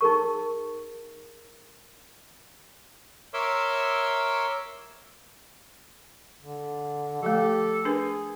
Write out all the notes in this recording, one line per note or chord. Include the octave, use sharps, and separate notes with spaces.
D#4 G#4 A#4 C#6
A#4 C#5 E5 C6 D6 E6
D3
F3 A3 G4 A4
D4 G#4 A#4 B4